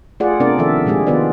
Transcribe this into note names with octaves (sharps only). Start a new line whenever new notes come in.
A3 F4 G#4 D5 F#5
C3 B3 C4 D4 A#4 D5
D#3 F3 D4 A4 E5
A#2 G#3 G4 G#4
D#3 B3 F4 B4 D5